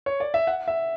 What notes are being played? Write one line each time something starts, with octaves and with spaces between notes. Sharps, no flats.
C#5
D5
E5
F#5
E5